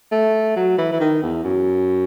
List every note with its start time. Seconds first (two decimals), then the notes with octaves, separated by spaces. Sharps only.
0.12 A3
0.56 F#3
0.78 E3
0.92 E3
1.00 D#3
1.23 E2
1.44 F#2